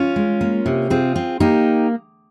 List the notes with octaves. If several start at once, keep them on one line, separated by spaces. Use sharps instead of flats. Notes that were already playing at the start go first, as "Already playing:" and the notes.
Already playing: C#4 F4
G#3
A#3
C3
C4 F4 G#4
C4
A#3 D#4 G4